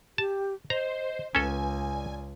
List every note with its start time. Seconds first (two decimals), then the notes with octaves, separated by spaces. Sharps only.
0.18 G4 A5
0.70 C5 D#5 A#5
1.35 C#2 C#4 A4 B4 G#5
1.94 D5